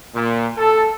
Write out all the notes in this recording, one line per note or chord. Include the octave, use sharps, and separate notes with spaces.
A#2
A4